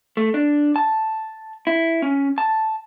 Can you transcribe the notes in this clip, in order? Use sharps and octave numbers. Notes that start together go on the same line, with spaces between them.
A3
D4
A5
E4
C#4
A5